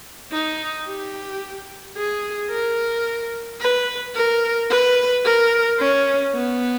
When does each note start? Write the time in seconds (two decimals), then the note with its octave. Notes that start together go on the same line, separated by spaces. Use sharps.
0.32 D#4
0.87 G4
1.96 G#4
2.51 A#4
3.60 B4
4.15 A#4
4.70 B4
5.25 A#4
5.79 C#4
6.35 B3